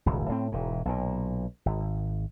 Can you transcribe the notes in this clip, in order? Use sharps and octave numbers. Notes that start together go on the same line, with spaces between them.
D#1 G#1 C#2
A2 C4
E1 G#2
B1 A#2
G#1